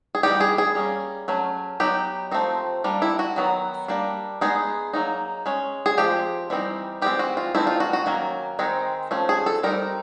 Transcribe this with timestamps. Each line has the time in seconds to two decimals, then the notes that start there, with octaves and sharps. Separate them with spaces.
0.15 G#4
0.23 E3 G3 B3 D#4 G4
0.41 G#4
0.58 G#4
0.75 G3 A#3 C#4
1.28 F#3 A3 C#4
1.80 F#3 B3 D#4 G4
2.31 F3 A3 C4 D#4
2.84 G3 A#3 D4
3.02 E4
3.19 F#4
3.36 D#3 F#3 B3
3.88 G3 A#3 D4
4.41 G#3 B3 D#4 G#4
4.93 F#3 A#3 D#4
5.46 G#3 C#4
5.86 G#4
5.98 F3 G#3 C4 G4
6.50 E3 G3 C4 D#4
7.02 E3 G#3 C4 G4
7.19 F#4
7.37 F4
7.55 E3 A3 C4 D#4 E4
7.67 F4
7.80 F#4
7.93 F#4
8.06 D#3 F#3 A#3 C#4
8.59 D#3 G#3 C4 D#4
9.11 F3 A3 C#4
9.29 G#4
9.46 A4
9.63 G3 C4 D#4 A#4